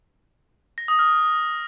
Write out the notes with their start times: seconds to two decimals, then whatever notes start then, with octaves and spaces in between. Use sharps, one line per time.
0.78 A#6
0.88 D#6
0.99 F6